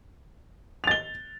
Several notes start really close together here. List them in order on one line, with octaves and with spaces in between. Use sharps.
F7 A6 G7